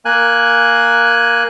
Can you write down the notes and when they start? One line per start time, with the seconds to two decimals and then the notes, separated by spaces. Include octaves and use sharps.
0.05 A#3 G#5 F#6